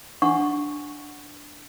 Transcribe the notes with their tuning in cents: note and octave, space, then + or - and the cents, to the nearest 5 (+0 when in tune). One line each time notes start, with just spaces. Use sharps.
D4 +0 F#5 +0 C#6 +0